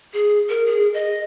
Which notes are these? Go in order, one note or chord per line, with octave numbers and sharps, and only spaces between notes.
G#4
A#4
G#4
D#5